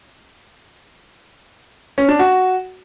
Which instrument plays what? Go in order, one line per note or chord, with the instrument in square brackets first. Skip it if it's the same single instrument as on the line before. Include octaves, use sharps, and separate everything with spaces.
[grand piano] C#4
D4
F#4